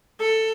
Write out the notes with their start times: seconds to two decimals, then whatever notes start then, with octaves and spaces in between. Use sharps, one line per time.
0.21 A4